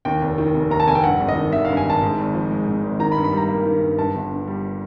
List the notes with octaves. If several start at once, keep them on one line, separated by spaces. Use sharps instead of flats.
D#2 G5
F1
D#3
F1
D#2 A#5
A5
F1 G#5
G5
G2 F#5
G#1
D#5
D#3
G#1 E5
G2 F5
G#5
G#1 A5
G#2
G#1
F3
G#3
G#2
G#1
D#3 A#5
B5
G2
B5
G3 A#5
A#3
D#3
G2
G2 A5
G1
D3
G3